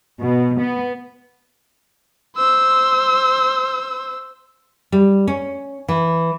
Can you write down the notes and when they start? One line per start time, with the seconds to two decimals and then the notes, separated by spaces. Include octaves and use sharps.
0.20 B2
0.60 B3
2.36 C5 E6
4.92 G3
5.28 C#4
5.88 E3